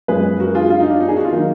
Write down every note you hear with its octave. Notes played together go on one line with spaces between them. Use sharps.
F#2 F3 G#3 G#4 B4
F#4 A#4
F4 G#4
F4
D#4
D4
D#4
G#4
F#4
F4
D#3 F#3 A#3 D#4